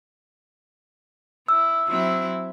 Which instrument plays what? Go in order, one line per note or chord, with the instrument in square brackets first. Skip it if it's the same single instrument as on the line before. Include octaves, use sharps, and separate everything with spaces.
[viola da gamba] E4 [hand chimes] E6
[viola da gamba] F#3 C4 E4